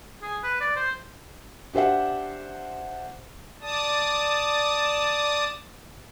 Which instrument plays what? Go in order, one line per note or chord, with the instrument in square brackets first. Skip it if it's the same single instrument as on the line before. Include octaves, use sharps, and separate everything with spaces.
[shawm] G#4
B4
D5
C5
[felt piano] D4 G4 C5 E5 F#5
[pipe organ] D5 A5 D#6